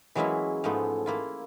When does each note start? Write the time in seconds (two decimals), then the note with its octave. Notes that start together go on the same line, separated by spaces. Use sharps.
0.15 E3 F#3 G#3 A#3 C#4 E4
0.64 G#2 F3 G#3 A3 B3
1.06 A#3 E4 F4